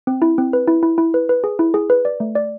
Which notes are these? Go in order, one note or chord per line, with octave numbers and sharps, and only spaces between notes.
C4
E4
C4
B4
E4
E4
E4
B4
B4
G#4
E4
G#4
B4
D5
A3
D5